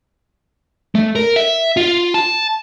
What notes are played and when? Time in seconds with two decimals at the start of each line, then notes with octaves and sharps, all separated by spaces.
0.95 A3
1.15 A#4
1.36 E5
1.77 F4
2.14 A5